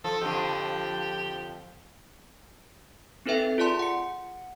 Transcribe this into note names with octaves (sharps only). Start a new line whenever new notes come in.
F3 A4
F2 D3 F3 G4
C4 D#4 A4 B4 E5 G5
F4 G#4 D5 A5 C6
F#5 C#7